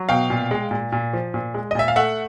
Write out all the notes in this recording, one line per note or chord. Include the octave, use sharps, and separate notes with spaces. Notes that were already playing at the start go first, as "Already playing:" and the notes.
Already playing: F#3
B2 F5 G5
A#2
G#3
A#2
A#2
F3
A#2
G#3
D#5
A#2 E5
F5
A3 E5 F#5